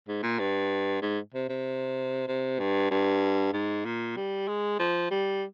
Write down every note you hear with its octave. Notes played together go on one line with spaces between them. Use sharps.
G#2
A#2
G2
G#2
C3
C3
C3
G2
G2
G#2
A#2
G3
G#3
F3
G3